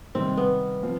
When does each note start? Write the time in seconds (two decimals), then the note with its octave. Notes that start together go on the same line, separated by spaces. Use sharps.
0.15 C3 D#3 G3 C4
0.37 B3
0.83 F3 C4 F4